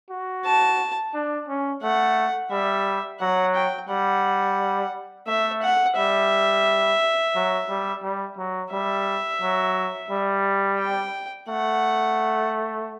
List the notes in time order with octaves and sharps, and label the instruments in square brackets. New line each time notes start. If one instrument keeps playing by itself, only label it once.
[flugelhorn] F#4
[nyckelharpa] A5
[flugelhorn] D4
C#4
[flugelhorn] A3 [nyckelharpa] F#5
[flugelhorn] G3 [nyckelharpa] E5
[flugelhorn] F#3 [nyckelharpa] F#5
[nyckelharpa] G5
[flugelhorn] G3 [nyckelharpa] F#5
[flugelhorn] A3 [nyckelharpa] E5
[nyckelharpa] F#5
[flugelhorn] G3 [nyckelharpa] E5
[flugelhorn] F#3
G3
G3
F#3
[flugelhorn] G3 [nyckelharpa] E5
[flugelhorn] F#3
G3
[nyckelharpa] G5
[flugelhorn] A3 [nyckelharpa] F#5